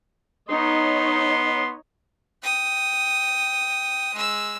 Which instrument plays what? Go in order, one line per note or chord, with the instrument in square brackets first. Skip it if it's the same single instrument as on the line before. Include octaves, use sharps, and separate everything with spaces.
[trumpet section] B3 C6 [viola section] D#4 C#5 D#5
[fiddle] G5 D#6
G#3 E6